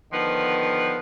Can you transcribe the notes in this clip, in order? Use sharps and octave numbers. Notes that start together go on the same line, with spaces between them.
D3 D#3 F3 B3